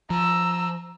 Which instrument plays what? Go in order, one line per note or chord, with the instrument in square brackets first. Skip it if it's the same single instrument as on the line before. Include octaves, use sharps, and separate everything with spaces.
[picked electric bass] F3 [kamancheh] A#5 E6